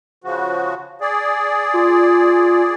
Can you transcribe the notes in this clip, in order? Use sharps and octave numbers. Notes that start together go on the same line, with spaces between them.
C#3 F3 F#4
G#4 D5
F4